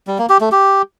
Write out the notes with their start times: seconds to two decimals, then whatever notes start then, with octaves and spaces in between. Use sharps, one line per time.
0.07 G3
0.18 A#3
0.29 G4
0.41 A3
0.52 G4